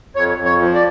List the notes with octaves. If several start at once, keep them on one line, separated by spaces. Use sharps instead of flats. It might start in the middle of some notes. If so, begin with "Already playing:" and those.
F2 C#5
F2
C#5
F3
D5